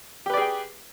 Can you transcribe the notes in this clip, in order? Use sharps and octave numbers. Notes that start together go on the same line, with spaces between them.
G4 G#4 B4 D5 G5